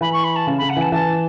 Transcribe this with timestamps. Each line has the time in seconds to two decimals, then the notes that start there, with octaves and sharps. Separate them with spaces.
0.01 E3 B5
0.13 C#6
0.24 B5
0.35 A5
0.47 C#3
0.58 C#3 B5
0.69 F#5
0.77 E3 A5
0.92 E3 A5